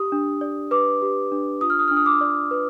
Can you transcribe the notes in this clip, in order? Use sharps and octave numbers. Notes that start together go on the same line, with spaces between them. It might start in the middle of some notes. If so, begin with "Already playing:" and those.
Already playing: G4 D#6
D4
D5
B4 D6
G4
D4
F4 D#6
F6
D#6
D4 F6
D#6
D6
D5
B4